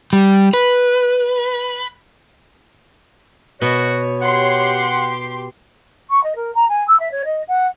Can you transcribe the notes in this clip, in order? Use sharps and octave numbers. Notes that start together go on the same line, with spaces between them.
G3
B4
B2 F#4 C#5
G4 F#5 C6
C#6
D#5
A#4
A#5
G#5
E6
E5
C#5
D#5
F#5